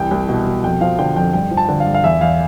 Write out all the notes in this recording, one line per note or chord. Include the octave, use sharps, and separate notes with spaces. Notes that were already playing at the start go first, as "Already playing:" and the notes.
Already playing: C2 E3 G5
C2
B2
B2
F2 G5
F3 F5
D3 G5
F2 G5
G2 G5
F3
A5
D3
F5
G2
F5
E2 E5
E2 F5